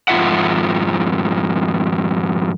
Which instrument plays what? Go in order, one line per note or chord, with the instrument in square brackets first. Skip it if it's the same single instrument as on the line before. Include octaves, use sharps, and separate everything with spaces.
[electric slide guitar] F2 G#2 F4 E5 F#5